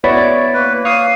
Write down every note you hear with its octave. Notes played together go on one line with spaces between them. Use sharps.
B3 E4 F#4 C#5 D5
A#3 B4
C#5 F5 D#6